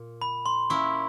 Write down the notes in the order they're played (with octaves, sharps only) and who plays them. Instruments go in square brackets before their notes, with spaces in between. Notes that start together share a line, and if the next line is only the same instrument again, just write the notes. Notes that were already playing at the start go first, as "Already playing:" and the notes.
Already playing: [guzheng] A#2
[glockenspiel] B5
C6
[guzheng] A#3 C#4 E4 [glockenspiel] C#6